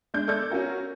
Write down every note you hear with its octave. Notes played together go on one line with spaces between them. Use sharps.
G#3 D4 G6
A4 D5 E6 G6 G#6
C#4 F4 F#4 A#4